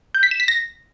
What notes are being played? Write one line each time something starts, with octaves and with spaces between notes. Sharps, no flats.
G6
B6
E7
B6
A#6